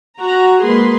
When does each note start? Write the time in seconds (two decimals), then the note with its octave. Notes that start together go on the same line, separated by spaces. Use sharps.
0.21 F#4 A#5
0.64 G#3 A#3 G#4 B4 C6